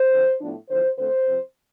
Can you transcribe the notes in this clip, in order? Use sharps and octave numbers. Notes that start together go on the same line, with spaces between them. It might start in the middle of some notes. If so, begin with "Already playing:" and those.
Already playing: C5
F2 D3 F3
A2 F3 B3 D4
E2 D3 F3 C5
D2 D3 A3 C4 C5
C3 F3 C4